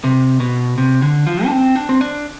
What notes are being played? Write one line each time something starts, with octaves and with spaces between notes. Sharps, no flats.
C3
B2
C3
D3
F3
D4
C4
D4
C4
D4